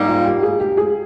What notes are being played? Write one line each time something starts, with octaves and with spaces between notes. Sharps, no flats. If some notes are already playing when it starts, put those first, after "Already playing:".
Already playing: G#2 G3 A#3 D#4
F4
G4
G#4
G4
G#4